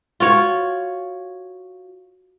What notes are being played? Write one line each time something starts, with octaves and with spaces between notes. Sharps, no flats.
F4 F#4 C#5